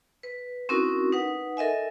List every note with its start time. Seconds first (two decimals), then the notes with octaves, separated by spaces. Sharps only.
0.23 B4
0.69 C4 C#4 D#4 E4 F#4 A#4
1.13 D#4 B4 F#5
1.57 A4 A#4 D#5 E5 G#5